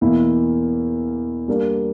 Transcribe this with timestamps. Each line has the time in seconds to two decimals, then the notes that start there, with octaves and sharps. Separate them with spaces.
0.01 E2 B2 A#3 E4 A#4
1.48 G3 A#3 D4 A#4